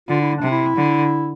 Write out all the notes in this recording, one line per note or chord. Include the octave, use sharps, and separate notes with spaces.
D3 F4
E4
D4
C3
E4
D3